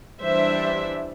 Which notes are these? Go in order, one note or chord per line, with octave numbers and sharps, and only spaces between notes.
E3 G3 D4 C5 E5